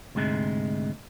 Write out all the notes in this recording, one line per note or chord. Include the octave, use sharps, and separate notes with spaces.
D2 G#2 C3 G#3